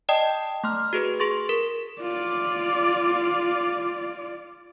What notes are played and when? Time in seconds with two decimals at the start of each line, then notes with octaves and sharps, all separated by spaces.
0.09 D5 D#5 G5 A5 D#6
0.64 A3 C6 F6
0.93 F#4 G#4 B4
1.20 G#4 C6 C#6 A6
1.49 A#4
2.01 F4 D5